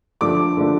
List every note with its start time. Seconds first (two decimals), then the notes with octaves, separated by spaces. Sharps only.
0.21 D3 F3 A3 D4 D6
0.57 D3 F3 A3 D4